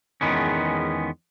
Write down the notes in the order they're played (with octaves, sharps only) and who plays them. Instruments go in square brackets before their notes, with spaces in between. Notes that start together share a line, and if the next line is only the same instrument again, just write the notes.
[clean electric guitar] E2 D#3 G#3 B3 C#4